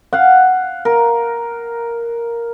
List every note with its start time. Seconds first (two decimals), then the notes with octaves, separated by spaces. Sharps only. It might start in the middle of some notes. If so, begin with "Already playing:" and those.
0.13 F5 F#5
0.85 A#4